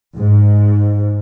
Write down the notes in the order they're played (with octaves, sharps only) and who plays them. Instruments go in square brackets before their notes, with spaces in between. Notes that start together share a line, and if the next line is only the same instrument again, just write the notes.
[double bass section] G#2